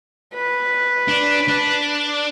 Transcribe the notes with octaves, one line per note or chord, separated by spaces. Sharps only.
B4
D4
D4